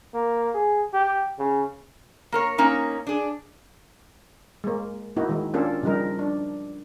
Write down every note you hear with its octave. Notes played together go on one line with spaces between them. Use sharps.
A#3
G#4
G4
C#3
A#3 A#4 C#5
A#3 C#4 D#4
D4 G#4
G#3 A#3
A#3 D#4 E4 F#4
D#3 G#3
A#3 C#4 D4 F4 G4 A4
C#3 F3 G3 D#4 A#4
D4